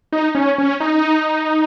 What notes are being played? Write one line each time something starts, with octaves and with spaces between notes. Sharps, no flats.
D#4
C#4
C#4
D#4